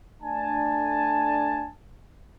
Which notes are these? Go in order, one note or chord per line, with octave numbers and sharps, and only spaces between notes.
A3 D4 G#5 A5